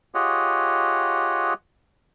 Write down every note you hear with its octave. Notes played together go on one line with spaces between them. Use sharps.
F4 G4 G#4 C#5 D#5 F#5